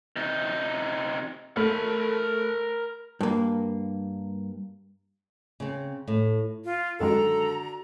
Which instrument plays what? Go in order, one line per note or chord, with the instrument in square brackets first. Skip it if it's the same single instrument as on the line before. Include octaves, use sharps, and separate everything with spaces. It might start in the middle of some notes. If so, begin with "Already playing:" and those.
[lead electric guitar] C3 D#4
[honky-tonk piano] A3 [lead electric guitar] A#4 B5
[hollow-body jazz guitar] G2 A#3
[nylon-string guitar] C#3 C4
A2
[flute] F4
[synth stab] F#2 D#3 G#3 [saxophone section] D3 A4 [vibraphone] F#4 [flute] A#5